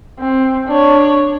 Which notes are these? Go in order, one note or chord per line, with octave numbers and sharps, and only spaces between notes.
C4
D4 C#5